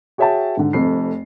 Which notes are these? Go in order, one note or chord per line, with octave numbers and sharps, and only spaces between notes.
F#4 G#4 C#5 E5 G5 A5
G#2 D3
F1 F2 C7